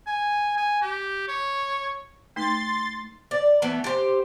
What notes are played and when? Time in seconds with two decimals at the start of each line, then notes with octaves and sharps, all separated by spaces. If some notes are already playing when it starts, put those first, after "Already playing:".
0.07 G#5
0.57 G#5
0.82 G4
1.28 C#5
2.36 A3 D#4 C6 A6
3.31 D5
3.62 E3 A3 B3
3.84 G4 C5